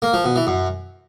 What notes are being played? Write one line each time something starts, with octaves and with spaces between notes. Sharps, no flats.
A#3
F3
B2
E3
F#2